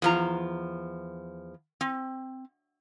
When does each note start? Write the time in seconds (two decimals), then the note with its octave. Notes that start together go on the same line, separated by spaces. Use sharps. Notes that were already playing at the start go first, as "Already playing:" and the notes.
0.02 E2 F3 A#5
1.81 C4